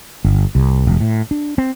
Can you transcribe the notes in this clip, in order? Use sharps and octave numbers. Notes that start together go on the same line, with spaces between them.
G1
C2
E1
A2
D4
C4